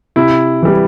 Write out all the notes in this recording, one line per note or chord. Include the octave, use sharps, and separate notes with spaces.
C3 E4
E3 G3